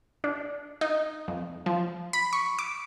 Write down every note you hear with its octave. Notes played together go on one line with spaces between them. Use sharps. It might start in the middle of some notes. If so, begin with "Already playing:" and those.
D4
D#4
F2
F3
B5
C#6
D6